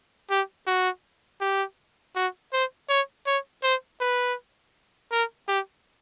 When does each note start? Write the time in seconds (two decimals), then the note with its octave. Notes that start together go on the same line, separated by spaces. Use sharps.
0.30 G4
0.67 F#4
1.40 G4
2.15 F#4
2.53 C5
2.89 C#5
3.26 C#5
3.63 C5
4.00 B4
5.12 A#4
5.48 G4